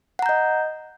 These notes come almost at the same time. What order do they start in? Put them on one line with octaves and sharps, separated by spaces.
F#5 A#5 G6 D#5